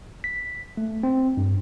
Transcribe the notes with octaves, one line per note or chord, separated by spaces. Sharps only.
B6
A3
C4
G2